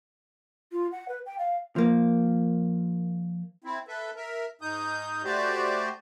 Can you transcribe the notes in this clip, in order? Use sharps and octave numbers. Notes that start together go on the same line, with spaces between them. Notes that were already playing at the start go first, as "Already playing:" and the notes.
F4
F#5
B4
G5
F5
F3 A#3
C4 E4
A4 B4 E5
A#4 E5
G#2 D#4 D#6 G6
A3 F#4 G4 C5 D5